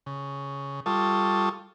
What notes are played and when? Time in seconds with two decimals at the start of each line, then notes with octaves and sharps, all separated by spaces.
0.06 C#3
0.86 G3 F4 A4 A5 C#6 D#6